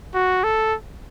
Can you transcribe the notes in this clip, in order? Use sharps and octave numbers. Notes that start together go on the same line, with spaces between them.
F#4
A4